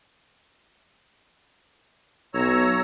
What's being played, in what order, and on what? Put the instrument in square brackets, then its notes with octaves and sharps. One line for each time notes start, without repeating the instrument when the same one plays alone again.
[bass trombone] B1 [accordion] C#5 A#5 E6